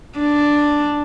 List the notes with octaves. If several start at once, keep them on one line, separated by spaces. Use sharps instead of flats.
D4